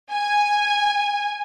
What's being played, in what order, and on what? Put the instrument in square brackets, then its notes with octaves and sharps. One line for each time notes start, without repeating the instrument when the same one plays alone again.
[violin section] G#5